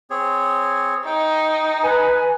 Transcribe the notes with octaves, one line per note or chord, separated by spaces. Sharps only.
C4 G#4 C#5
D#4 G5
B4 G#5